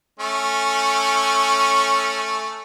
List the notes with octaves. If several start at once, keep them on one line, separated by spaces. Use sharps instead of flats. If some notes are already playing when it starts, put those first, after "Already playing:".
A3 C#4